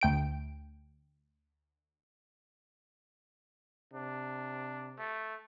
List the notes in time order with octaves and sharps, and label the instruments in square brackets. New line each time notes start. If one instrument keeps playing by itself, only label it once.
[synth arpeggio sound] D2 G5 D7
[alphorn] C3 [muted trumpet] D4
[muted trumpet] A3